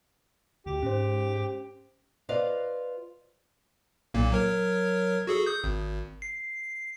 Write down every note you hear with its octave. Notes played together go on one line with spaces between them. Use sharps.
D2 G4
G#2 C#4 C5
F4 B4 C5 D5 D#5 F5
B1 A#2 A#3
F#3 A#4 C#5
F#4 G#4 A4
D#6 G6
G#1
C7